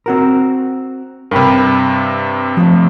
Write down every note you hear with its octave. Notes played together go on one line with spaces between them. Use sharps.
C4 F#4 A#4
G2 C3 A#4 G5 B5
F3 A3